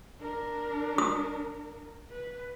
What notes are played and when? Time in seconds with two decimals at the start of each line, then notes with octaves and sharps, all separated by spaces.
0.20 D4 A#4
0.98 D#6
2.10 B4